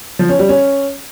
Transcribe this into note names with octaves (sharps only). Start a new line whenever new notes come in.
F3
C#4
G3
C#4